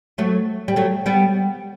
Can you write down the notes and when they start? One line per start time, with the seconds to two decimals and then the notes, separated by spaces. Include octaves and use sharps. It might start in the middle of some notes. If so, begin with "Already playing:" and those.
0.18 F#3 A3
0.68 G3
0.76 F#3 A3
1.06 G3 B3